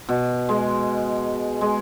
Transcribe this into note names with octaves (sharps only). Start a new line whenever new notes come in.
B2
G#3
G#3